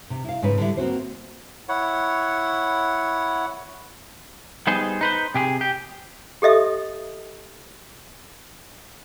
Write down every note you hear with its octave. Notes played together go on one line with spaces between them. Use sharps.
C3
E4 F5
G#2 C#3 C#4 B4
D3 G3 E4
A#3 C4 F#4 C5
E4 C#5 F#5
G3 B3 D#4 G#4 C5
D#4 B4 C5
C3 G4 G#4
G4
G4 A4 D#5 E5 D#6